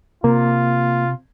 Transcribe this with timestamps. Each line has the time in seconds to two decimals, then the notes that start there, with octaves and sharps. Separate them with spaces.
0.24 C3 A#3 F4